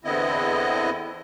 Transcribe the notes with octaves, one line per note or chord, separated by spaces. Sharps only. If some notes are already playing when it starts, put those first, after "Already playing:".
E2 D3 B3 C4 E4 D#5